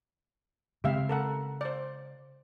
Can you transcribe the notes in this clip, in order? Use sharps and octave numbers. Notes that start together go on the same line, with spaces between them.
C#3 G#3 C4 G4 E5 F5
A4 A#4 F#5
C5 D5